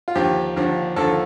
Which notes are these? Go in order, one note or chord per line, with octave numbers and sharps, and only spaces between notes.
F4
D#2 D3 F3 G4
D#2 D3 F3
D#2 D3 F3 A4